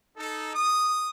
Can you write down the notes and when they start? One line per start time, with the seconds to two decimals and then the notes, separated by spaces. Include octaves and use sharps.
0.17 D#4 A4
0.54 D#6